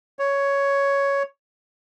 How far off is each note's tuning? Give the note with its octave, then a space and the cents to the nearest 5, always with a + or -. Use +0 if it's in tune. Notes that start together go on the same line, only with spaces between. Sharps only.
C#5 +5